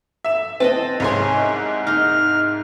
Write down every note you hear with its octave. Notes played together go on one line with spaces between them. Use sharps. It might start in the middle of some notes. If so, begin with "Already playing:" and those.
E5 E7
C4 D#5 F#5 A5
C2 G#2 C#5 G#5 C6
D#4 F6